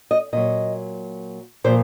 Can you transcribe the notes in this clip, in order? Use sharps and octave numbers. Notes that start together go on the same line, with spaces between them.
D#5
A#2 F#3 D#5
A#2 F3 C5